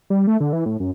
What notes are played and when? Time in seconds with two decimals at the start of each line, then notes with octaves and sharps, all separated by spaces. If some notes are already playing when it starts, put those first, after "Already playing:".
0.10 G3
0.27 A3
0.40 D3
0.53 E3
0.66 A2
0.80 F#2